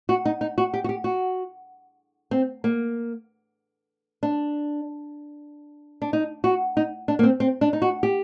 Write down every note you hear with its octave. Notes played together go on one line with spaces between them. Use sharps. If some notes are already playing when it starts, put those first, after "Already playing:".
F#4
D#4
D#4
F#4
G4
F#4
G4
F#4
C4
A#3
D4
D4
D#4
F#4
D#4
D4
A#3
C4
C4
D4
D#4
F#4
G4